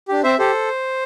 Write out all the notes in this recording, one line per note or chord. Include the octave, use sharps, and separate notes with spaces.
D4 G4
C4 C5 E5
G4 A4 C5